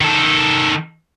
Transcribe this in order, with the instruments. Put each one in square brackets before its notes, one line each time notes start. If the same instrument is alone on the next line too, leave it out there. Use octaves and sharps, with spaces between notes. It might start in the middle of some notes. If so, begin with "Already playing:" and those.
[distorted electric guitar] D#3 A4